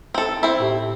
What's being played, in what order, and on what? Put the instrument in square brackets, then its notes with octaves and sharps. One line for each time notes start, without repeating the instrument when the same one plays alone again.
[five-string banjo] C4 A4
C4 E4
[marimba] A2 G4